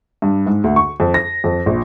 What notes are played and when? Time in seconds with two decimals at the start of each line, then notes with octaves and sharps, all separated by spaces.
0.22 G2
0.46 G#2
0.64 D2
0.76 C#6
1.00 F2
1.14 A#6
1.44 F2
1.66 A#1